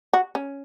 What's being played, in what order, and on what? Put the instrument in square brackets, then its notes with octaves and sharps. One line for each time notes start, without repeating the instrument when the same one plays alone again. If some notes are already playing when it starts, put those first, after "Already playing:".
[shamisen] F#4
C#4